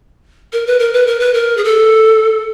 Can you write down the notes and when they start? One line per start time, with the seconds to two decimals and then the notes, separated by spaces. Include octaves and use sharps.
0.53 A#4
0.67 B4
0.79 A#4
0.93 B4
1.07 A#4
1.20 B4
1.34 A#4
1.57 G#4
1.64 A4